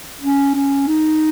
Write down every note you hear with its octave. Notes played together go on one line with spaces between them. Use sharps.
C#4
C#4
D#4